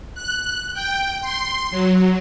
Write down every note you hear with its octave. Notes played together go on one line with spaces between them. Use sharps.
F#6
G5
C6
F#3